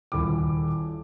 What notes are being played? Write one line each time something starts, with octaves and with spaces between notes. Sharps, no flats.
D#1 E4 D6